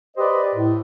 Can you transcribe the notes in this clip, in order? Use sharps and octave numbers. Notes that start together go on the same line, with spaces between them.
G4 B4 C5 D5 D#5
A2